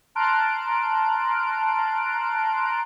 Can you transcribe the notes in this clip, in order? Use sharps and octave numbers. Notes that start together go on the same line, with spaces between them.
A5 A#5 C6 F6 F#6 D7